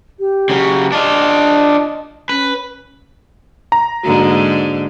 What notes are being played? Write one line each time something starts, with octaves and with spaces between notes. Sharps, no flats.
G4
C#3 F#3
D4 F4 D#5
C#4 B4
A#5
G#2 D3 A#3 F#4